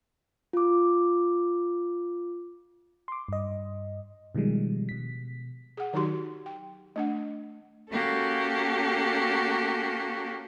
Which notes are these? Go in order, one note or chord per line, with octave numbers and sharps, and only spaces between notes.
F4 D6
C6 D6
G2 D#5
B2 D#3 F3 G3 G#3
B2 B6
G#4 F#5
D#3 F#3 D#4 F#4 G4 C6
G5
A3 D4 F#5
A#3 C#4 F#4 G4 A4